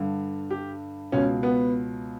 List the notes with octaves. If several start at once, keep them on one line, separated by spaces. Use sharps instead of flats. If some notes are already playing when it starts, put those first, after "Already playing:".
Already playing: G2 D3
G4
C#2 B2 C#4
B3